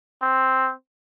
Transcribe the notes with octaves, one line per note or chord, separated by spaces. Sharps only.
C4